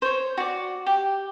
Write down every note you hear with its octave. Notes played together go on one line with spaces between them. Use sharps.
C5 C#5
F#4 D5
G4